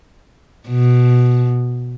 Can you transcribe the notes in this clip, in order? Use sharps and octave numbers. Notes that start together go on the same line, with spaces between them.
B2